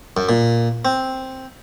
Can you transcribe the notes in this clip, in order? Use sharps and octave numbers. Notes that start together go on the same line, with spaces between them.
F#2
A#2
C4